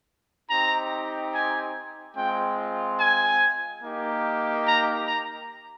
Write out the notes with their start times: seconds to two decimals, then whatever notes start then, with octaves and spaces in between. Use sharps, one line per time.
0.50 C4 D#4 G4 A#5
1.33 G#5
2.16 G#3 C4 F4 G5
2.99 G#5
3.82 A#3 D#4 G4
4.66 A#5
5.07 A#5